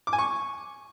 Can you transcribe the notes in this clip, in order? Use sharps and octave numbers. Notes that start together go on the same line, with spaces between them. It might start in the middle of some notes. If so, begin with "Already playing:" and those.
D6
G#5
C#6